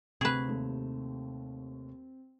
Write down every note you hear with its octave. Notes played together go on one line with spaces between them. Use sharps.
D2 C3 C4 G#4 B4 C#6 E7
D#2 A3